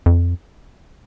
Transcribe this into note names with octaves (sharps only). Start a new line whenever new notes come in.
F2